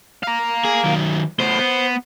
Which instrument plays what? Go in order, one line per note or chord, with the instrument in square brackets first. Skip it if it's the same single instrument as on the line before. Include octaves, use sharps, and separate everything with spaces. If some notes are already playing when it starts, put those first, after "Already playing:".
[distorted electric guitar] F5 A#5
[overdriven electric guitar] G#4
D#3 F#3
[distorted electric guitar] A2 B3 [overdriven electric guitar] C5
[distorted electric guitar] B3